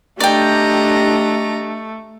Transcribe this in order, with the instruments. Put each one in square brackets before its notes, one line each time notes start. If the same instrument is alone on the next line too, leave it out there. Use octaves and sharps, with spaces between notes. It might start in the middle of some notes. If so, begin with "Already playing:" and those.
[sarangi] A3 [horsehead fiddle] D4 G4 [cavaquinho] D5 G5 [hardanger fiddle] D#5 A#5